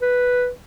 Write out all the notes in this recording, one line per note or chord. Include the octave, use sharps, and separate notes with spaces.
B4